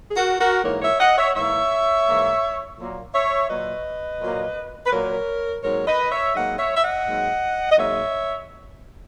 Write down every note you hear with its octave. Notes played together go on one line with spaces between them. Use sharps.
G#4
F#4 A#4
F#4 A#4
G#2 E3 A#3 A#4 C#5
C#5 E5
D#5 F#5
C#5 E5
G#2 E3 A#3 C#5 E5
G#2 E3 A#3
A#2 F#3 A#3
C#5 E5
A#2 F#3 A#3 B4 D#5
A#2 F#3 A#3
B4
A#2 F#3 A#3 A#4 C#5
G#2 F#3 A#3 A#4 C#5
B4 D#5
C#5 E5
G#2 F#3 A#3 D#5 F#5
C#5 E5
E5
D#5 F#5
G#2 F#3 A#3
D#5
G#2 F#3 A#3 C#5 E5